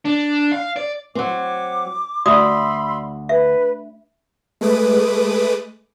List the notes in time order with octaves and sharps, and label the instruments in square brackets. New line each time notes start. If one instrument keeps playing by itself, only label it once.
[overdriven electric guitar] D4
F5
D5
[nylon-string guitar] F#3 C4 [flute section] D6
[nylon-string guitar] D2 [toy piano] F#4 D5 D#6 [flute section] B5 C6 E6
[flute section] B4 [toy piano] E5
[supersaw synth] G#3 A3 B4 D6 D#6